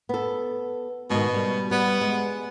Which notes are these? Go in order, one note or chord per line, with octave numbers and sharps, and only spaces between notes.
B3 A4
G#2 B2 D#3
G3
G3 B3
G#3